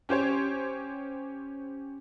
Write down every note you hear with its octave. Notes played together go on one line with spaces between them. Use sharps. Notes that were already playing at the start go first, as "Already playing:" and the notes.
C#4 G4 C5 C#5